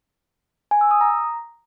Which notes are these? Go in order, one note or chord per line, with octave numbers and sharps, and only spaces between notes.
G#5
E6
D#6
A#5